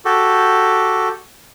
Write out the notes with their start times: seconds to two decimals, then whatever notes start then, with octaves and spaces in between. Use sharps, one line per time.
0.05 F#4 G4 A4